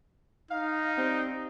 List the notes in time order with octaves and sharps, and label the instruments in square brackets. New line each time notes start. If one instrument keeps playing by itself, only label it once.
[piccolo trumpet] D#4 [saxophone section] F5
[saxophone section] G3 C4